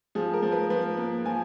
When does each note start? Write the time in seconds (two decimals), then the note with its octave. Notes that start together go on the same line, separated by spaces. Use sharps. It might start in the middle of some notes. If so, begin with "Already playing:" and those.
0.15 F3 G#4
0.34 A#4
0.42 F3
0.52 B4
0.70 F3 B4
0.97 A#3
1.25 F3 G#5